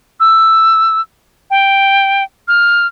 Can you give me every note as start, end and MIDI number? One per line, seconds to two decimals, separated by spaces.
0.20 1.01 88
1.51 2.24 79
2.48 2.87 89